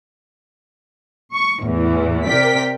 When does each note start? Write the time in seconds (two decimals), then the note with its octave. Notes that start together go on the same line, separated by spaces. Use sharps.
1.32 C#6
1.61 E2 A2 E3
2.26 C3 A#4 D5 G5 B6